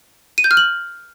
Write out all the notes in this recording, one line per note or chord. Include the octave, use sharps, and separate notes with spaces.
D#7
G6
F6
F#7